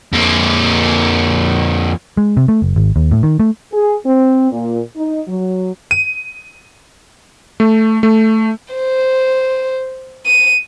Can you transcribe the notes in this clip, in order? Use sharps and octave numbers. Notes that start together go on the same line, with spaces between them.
F2 A#3
G#3
C3
A3
F#1
G#1
D#2
A2
D#3
A3
G#4
C4
A#2
D#4
F#3
D#7
A3
A3
C5
D#7